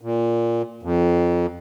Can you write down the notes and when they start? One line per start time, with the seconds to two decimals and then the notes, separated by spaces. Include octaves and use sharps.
0.01 A#2
0.83 F2